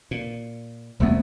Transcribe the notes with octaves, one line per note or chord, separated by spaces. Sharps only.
A#2
D#1 C2 F2 A3 B3